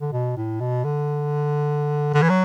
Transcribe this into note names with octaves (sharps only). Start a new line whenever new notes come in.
D3
B2
A2
B2
D3
D3
E3
F#3